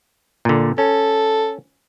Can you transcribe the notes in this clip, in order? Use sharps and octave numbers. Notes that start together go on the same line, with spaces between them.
A#2 D3
C#4 A4